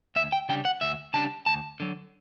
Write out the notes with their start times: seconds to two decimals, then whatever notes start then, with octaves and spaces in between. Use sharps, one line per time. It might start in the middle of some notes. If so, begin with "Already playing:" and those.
0.16 D2 E5
0.32 G5
0.49 C#3 G3 D4 G5
0.65 F#5
0.81 D2 E5
1.14 C#3 G3 D4 A5
1.46 D2 A5
1.80 D3 F#3